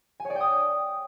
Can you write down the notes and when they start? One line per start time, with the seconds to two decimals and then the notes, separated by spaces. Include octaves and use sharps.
0.20 G#5
0.25 C#5
0.30 D5
0.35 G5
0.40 D#6